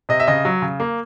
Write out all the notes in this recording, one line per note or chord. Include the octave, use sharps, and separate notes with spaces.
C3 D#5
E5
C#3 D#5
F#3
C#3
A#3